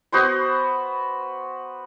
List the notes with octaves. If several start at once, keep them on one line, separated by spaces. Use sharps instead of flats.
B3 F#4 C5 C6